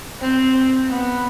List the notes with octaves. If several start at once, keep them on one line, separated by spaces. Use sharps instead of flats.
C4
B3